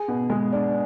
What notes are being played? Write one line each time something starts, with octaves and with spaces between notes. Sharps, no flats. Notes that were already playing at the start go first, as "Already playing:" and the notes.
Already playing: G#4
B2
G#3
D4